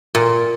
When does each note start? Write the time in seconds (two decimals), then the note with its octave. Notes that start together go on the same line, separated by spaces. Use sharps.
0.15 A#2